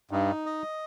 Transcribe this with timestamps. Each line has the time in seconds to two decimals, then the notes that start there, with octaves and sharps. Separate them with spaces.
0.11 G2 D#4
0.46 D#5